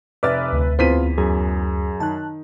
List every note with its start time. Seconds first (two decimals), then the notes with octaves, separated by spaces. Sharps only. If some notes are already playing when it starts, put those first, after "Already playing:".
0.23 F1 B4 D5 E5 D6 E6 F6 A6
0.53 D2
0.79 E2 C4 F4 B4 C5 B6 D#7
1.18 F#2 G#4
2.00 D#3 A5 F#6